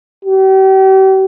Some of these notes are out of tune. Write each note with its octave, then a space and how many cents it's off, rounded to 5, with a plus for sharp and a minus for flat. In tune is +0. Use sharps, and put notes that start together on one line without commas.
G4 -40